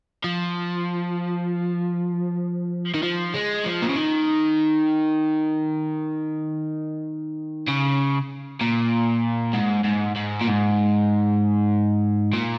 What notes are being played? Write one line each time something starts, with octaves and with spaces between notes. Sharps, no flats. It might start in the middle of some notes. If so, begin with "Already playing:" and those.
F3
D#3
F3
G#3
F3
A#2
C#3
D#3
C#3
A#2
G#2
G#2
G#2
A#2
G#2
A#2